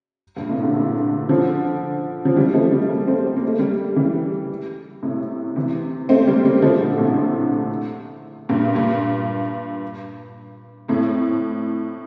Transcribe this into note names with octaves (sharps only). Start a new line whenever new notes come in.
G2 A#2
A2 C3
A#2 D3
A#2 D3
D3 F3
F3
E3 G3
F3 A3
G3 A#3
A3
G3 A#3
A3 C4
C4
A#3
A3
G3 A#3
E3 G3
A2 C3
C3 E3
A3 C4
G3 A#3
G3 A#3
A#3
F3 A3
A#2 D3
A2 C3
A#2 D3
G2 A#2
G2 A#2
F2 A2